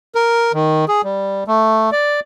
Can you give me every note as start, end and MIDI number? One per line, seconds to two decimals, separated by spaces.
0.15 0.52 70
0.53 0.85 51
0.88 1.02 68
1.04 1.44 55
1.47 1.90 57
1.92 2.20 74